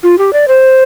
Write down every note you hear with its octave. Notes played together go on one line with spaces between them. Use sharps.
F4
G4
D5
C5